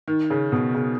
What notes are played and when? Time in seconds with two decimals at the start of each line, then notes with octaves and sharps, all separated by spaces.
0.08 D#3
0.30 C#3
0.52 B2
0.75 C#3